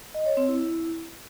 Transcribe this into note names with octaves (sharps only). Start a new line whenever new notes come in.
D#5
C#5
C4
E4